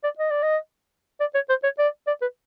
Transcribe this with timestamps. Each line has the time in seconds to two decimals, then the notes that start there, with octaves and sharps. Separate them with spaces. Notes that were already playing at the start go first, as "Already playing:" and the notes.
0.04 D5
0.18 D#5
0.30 D5
0.42 D#5
1.20 D5
1.35 C#5
1.49 C5
1.63 C#5
1.79 D5
2.07 D5
2.22 B4